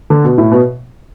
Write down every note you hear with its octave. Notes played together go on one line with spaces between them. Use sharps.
D3
B2
A2
B2